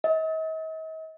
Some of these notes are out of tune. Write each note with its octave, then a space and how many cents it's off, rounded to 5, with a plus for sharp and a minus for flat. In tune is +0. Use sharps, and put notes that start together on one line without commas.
D#5 +45